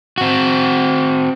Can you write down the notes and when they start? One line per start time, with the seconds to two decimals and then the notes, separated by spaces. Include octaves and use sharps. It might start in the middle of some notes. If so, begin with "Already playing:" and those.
0.18 C4 F#4